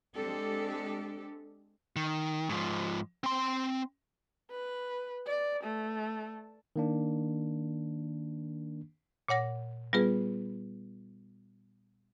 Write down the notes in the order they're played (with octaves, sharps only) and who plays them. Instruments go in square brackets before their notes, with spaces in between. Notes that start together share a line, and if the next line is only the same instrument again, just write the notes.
[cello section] G#3 C4 D4 G4 A4
[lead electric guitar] D#3
G#2 F3
C4 C6
[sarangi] B4
D5
A3
[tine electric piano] D#3 A#3 D4
[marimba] A#2 C#5 F#5 A#6
G3 B3 F4 G#4 B4